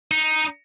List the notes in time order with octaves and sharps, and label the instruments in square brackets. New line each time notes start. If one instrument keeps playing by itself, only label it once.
[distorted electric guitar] D#4